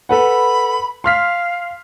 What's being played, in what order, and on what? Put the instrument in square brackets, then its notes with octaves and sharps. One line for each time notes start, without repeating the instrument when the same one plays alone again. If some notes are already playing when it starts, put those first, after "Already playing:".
[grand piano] A4 B4 F#5 [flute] B5
[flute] F5 [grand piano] C6 F6 B6